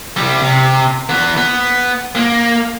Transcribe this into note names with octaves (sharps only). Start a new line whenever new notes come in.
G3 E4
C3
E3 B3
B3
A#3